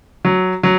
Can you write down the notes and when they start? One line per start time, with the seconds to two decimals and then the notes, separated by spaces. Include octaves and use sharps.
0.25 F#3
0.63 F#3